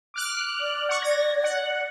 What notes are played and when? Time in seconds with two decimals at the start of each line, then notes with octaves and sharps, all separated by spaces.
0.14 D6 F6 F#6
0.60 D5
0.89 F#5 C#6
1.02 G#6 A#6
1.44 F#5